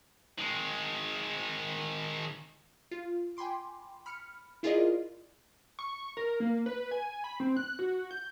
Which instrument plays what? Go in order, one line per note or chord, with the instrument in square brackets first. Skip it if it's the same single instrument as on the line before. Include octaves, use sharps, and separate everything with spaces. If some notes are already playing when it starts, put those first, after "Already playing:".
[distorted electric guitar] D#3 G#3
[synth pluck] F4
G5 G#5 B5 C6 D6
B5 F6 C#7
E4 F4 G#4 A#4 D5 D#5
[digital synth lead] C#6
A#4
A#3
B4
G#5
B5
C4
F#6
F#4
G6